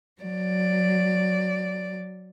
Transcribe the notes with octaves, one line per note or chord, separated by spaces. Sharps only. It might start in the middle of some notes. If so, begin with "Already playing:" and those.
F#3 D5